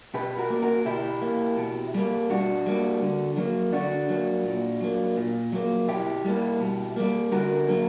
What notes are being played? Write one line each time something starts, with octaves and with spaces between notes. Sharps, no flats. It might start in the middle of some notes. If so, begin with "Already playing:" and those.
B2 G4 B4
F#4 A#4
A#3
F#4 A#4
B2 E4 G4
A#3
B2
G3 A#3
B2 D4 F#4
G3 A#3
D3
F#3 A#3
D3 D4 F#4
F#3 A#3
A#2
F#3 A#3
A#2
F#3 A#3
B2 E4 G4
G3 A#3
B2
G3 A#3
D3 F#4 A#4
F#3 A#3